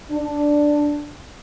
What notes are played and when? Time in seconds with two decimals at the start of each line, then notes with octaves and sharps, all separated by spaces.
0.11 D4